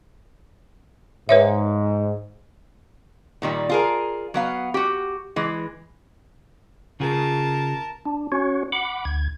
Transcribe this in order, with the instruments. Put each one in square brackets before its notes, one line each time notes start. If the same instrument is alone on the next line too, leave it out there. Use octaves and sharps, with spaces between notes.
[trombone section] G#2 [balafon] B4 C#5 E5
[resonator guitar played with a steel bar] A#2 D#3 G3
F4 G#4 A#4
F#3 B3 F5
F#4 G4
E3 G#3
[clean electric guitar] C#3 F4 G#4 [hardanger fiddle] A#4 A5
[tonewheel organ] D4
C#4 F#4 C#5
F#5 B5 D6
D2 G#6